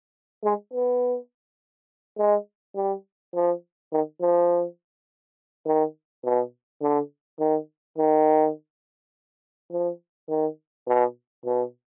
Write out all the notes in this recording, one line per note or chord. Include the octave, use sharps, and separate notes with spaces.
G#3
B3
G#3
G3
F3
D#3
F3
D#3
B2
D3
D#3
D#3
F3
D#3
B2
B2